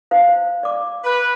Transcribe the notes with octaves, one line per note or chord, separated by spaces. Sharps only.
D#4 C5 F5
D5 D6
B4